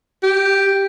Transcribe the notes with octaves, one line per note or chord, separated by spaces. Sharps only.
G4